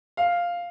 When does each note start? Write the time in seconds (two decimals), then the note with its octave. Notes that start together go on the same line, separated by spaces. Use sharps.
0.17 F5